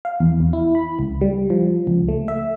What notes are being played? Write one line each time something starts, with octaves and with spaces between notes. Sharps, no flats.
F5
E2
E2
E4
B5
C#2
G3
F3
C#2
A3
E5